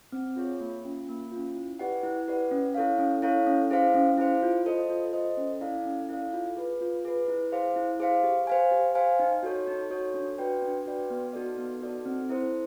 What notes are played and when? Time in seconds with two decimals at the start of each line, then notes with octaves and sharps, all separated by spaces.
0.12 C4
0.36 F4 G#4 C#5
0.61 A#3
0.84 C#4 F4
1.08 A#3
1.32 C#4 F4
1.55 E4
1.79 G4 B4 D5 F#5
2.03 E4
2.28 G4 B4 D5 F#5
2.51 C#4
2.75 E4 A4 C#5 F5
2.98 C#4
3.22 E4 A4 C#5 F5
3.46 C#4
3.70 E4 G#4 C5 F5
3.94 C#4
4.18 E4 G#4 C5 F5
4.43 F4
4.66 A4 C5 D#5
4.90 F4
5.13 A4 C5 D#5
5.37 C#4
5.61 E4 A4 D5 F5
5.85 C#4
6.09 E4 A4 D5 F5
6.33 F4
6.57 G#4 B4
6.81 F4
7.05 G#4 B4
7.28 E4
7.52 G#4 C5 F5
7.76 E4
8.00 G#4 C5 F5
8.24 G4
8.47 C5 F5 G#5
8.71 G4
8.95 C5 F5 G#5
9.19 D#4
9.43 F#4 A4 C#5
9.67 D#4
9.90 F#4 A4 C#5
10.14 D4
10.38 F#4 B4 D5 G5
10.62 D4
10.86 F#4 B4 D5 G5
11.10 B3
11.33 D#4 F#4 A4 D5
11.58 B3
11.82 D#4 F#4 A4 D5
12.06 C4
12.29 E4 A4 C5